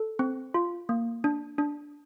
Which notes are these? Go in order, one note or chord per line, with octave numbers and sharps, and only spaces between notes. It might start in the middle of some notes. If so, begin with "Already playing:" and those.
Already playing: A4
C4
F4
A#3
D4
D4